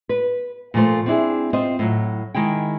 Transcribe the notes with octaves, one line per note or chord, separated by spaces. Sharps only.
B4
A#2 F3 A3 C5
C4 D4 E4 G#4
C4 F4 C5 D#5
A2 D#3 F#3
D#3 G#3 E4 G5